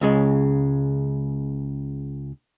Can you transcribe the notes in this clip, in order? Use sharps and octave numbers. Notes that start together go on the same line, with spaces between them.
C#2 C#3 G#3